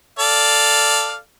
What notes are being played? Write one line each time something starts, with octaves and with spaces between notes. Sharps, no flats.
A4 D5 F5